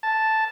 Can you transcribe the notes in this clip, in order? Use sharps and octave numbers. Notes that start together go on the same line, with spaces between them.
A5